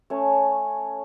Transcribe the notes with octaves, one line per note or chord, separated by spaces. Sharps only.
A3 C#4 C#5